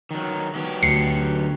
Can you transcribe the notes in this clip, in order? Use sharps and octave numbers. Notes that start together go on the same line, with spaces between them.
D#3 F#3
F#3 B3 G4
D2 C7 C#7